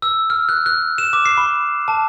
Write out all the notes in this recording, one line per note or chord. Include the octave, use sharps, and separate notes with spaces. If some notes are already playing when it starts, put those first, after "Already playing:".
E6
F6
F#6
F#6
E7
D6
C7
B5
A5